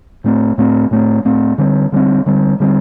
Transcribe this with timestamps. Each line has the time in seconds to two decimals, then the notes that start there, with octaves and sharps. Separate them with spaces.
0.24 A2 A3 C4
0.58 A2 A3 C4
0.91 A2 A3 C4
1.25 A2 A3 C4
1.58 D3 G3 C4
1.92 D3 G3 C4
2.26 D3 G3 C4
2.60 D3 G3 C4